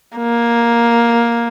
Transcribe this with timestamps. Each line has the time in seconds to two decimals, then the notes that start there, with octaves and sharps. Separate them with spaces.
0.17 A#3